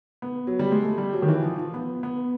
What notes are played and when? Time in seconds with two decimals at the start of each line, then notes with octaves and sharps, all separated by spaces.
0.22 B3
0.47 F#3
0.59 G3
0.72 G#3
0.83 A3
0.98 G3
1.13 F#3
1.22 D#3
1.28 E3
1.43 F3
1.58 F3
1.74 B3
2.03 B3